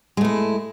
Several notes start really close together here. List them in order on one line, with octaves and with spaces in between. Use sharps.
G#3 A3 E4